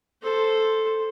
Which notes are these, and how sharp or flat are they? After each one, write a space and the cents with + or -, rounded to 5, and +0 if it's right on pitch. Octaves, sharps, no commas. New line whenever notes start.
A4 +0 C5 +0